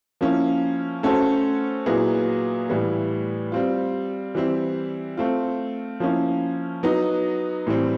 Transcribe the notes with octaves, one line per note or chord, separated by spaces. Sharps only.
F3 A#3 C#4 E4
A3 C#4 F#4 A4 C5
A#2 F#3 B3 E4 G#4
A2 E3 G3 B3 E4
G3 C4 F4
E3 G3 C4 E4
A3 C4 F4
F3 A#3 C#4 E4
F#3 B3 D#4
A2 E3 G3 C4